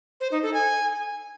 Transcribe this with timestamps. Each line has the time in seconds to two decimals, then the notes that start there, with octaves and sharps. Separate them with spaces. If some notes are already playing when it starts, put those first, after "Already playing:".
0.21 C5
0.32 D#4
0.43 A4
0.54 G#5